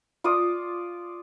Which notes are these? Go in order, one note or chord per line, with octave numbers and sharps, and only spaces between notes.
F4 D5 D6 D#6